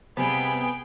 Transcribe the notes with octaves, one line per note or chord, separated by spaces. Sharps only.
C3 G3 B3 G#4 G5